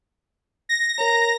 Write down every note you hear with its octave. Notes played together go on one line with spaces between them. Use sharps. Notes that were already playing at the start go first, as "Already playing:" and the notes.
A#6
A#4 C#5 A#5